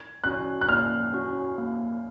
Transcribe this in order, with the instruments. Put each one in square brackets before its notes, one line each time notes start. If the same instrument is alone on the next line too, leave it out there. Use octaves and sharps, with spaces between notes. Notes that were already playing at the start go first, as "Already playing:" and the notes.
Already playing: [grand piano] G#6
[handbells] C#4 F#4 [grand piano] F#6
[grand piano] F#6
[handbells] A#3 [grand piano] F6
[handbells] C#4 F#4
A#3